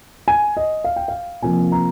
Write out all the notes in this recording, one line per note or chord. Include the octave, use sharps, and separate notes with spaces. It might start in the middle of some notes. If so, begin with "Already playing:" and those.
G#5
D#5
F5
G5
F5
C3 F3 A#3 G#5
A#5